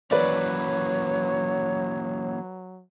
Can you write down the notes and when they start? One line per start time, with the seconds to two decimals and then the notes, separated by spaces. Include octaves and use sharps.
0.11 E3 F#3 A#3 C#4 B4 C#5 D5